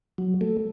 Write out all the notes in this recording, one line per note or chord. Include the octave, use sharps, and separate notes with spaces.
F#3
A3